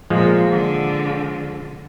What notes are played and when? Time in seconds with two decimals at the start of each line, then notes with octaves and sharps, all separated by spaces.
0.10 A#2 F3 G#3
0.52 D3